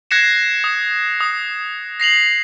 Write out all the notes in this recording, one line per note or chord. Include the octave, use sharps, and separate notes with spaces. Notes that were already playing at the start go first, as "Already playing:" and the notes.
F#6 G#6 A#6 C7 C#7 E7
D#6
D#6
A#6 C7 F7 F#7